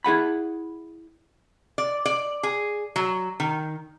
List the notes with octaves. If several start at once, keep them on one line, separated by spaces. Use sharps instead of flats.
E4 G#4 F#5 B5
D5
D5
G#4
F#3
D#3